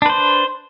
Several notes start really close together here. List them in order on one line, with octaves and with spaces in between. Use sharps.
D4 B4 C5